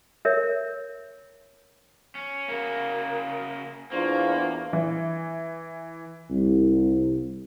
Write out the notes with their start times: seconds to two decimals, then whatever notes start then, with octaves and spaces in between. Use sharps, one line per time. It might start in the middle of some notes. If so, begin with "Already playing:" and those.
0.25 A#4 C#5 E5
2.15 C#4
2.48 C#3 A#3 A#4
3.92 E2 A#3 D4 F4 C5 C#6
4.73 E3
6.30 C2